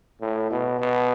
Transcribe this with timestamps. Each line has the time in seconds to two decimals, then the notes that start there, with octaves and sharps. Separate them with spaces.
0.21 A2
0.51 B2
0.80 B2